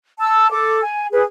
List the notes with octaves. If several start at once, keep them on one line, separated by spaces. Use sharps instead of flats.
A5 E6
A4 D6
G#5
G#4 B4